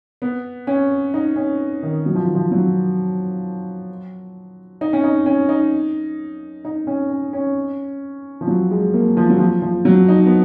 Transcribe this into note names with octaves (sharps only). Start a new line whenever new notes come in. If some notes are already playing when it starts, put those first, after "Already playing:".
B3
C#4
D#4
C#4
D#3
F#3
F3
D#3
F3
F#3
D#4
C#4
D#4
C#4
D#4
D#4
C#4
C#4
C#4
F3
F#3
G#3
A#3
F3
F#3
F3
F3
F#3
D#4
B3